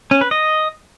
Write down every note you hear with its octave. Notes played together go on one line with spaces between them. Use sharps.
C#4
B4
D#5